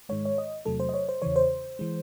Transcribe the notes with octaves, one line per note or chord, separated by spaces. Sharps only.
G#2 D#3 G#3 C#5
C#5
D#5
E2 C3 F#3 A3 A4
C5
D#5
C#5
C5
E2 C#3 E3 C#5
C5
E3 G#3